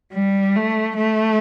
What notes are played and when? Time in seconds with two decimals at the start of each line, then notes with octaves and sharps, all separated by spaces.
0.13 G3
0.56 A3
0.96 A3